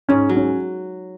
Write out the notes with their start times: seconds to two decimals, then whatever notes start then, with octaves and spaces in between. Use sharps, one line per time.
0.09 G#2 C#4
0.29 F#3
0.36 C#4